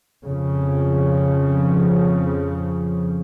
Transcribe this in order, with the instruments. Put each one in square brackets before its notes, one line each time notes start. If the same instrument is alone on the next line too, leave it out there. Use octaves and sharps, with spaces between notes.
[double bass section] F2 C#3 F3